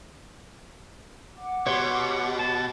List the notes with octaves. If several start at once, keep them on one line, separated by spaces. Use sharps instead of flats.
F#5 D6
B2 G4 C#5 C6
A5